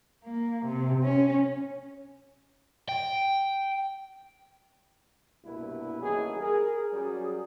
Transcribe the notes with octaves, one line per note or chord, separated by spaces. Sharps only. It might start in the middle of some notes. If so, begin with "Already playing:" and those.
A#3
C3
C#4
G5
C2 G2 B2 A#3 E4 B4
A1 D#3 F#3 A#3 G#4
G#4 A#4
F#3 G3 C#4 G#4